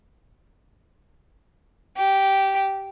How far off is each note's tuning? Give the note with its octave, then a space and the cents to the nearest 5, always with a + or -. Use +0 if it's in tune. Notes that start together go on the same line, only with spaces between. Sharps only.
G4 -10